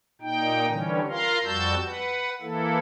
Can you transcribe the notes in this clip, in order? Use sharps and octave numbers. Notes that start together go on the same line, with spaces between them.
A#2 D#4 G5
D3 E3 G3 C#4
F4 A#4 F5 A#5 C6
F2 G3 F#4 A5 E6 G6
B4 F#5
E3 A#3 E4 A4